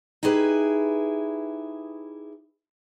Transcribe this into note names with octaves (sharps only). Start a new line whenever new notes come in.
D#4 E4 G4 G#4 B4